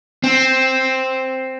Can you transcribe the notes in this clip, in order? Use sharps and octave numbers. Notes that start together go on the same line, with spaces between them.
C4